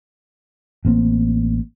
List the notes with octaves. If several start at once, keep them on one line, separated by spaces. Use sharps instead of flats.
A1 A#3 C4